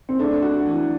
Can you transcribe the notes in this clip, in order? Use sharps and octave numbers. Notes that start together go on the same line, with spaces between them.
C4
A3 D4
F#4
E3